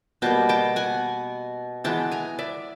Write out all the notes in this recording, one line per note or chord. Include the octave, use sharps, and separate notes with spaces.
B2 G3 A#3 G5 A5
G5 A5
F#5 G#5
E3 G#3 B3 G5 A5
G#5 A#5
D5 E5